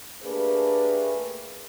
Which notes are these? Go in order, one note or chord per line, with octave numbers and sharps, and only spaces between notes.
A3 A#3 D4 G4 G#4 B4